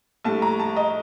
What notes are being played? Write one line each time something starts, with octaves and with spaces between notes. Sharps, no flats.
A#1 A2 G3 A5
A#5
A5
D#5